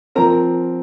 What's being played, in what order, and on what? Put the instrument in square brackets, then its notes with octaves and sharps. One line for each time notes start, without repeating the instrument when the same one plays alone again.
[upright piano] F3 C4 A#4 A#5